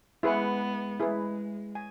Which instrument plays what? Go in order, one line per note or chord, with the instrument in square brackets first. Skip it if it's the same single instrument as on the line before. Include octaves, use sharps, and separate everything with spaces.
[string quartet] G#3 B3 [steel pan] E4 G#4 B4 F#5
[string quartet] G#3 [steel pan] E4 G#4 B4
[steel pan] G#5